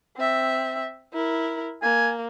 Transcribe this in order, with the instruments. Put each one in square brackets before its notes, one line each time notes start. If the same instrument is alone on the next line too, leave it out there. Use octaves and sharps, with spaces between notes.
[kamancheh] C4 E5
E4 A#4
[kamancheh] A#3 [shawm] G#5